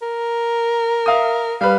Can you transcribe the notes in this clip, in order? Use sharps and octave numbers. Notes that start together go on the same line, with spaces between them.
A#4
E5 F5 D#6
G3 B4 F5